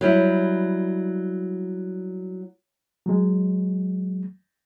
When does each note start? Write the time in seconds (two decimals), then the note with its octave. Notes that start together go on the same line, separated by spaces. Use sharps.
0.01 F#3 G3 E4
3.06 F#3 G#3